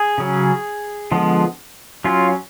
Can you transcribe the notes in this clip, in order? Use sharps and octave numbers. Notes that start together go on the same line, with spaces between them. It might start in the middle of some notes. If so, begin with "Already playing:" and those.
Already playing: G#4
C#3 F#3 C#4
D3 F3 G#3 B3
F#3 C#4 F4